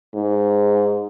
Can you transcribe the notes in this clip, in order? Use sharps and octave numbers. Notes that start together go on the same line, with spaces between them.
G#2